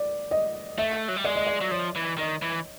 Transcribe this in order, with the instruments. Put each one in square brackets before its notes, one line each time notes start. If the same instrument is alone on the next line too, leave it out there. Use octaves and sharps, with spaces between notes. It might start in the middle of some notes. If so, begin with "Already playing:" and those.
Already playing: [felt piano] D5
D#5
[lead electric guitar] A3 [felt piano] E5
[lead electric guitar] F#3
G3
[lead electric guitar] G#3 [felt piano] D5
[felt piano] D#5
D5
[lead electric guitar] F#3
[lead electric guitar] F3 [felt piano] C#5
[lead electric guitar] E3
[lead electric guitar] D#3 [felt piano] D#5
[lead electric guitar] E3